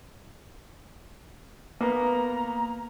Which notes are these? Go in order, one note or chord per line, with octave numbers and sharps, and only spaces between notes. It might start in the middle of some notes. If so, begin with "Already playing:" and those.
A#3 B3 A#5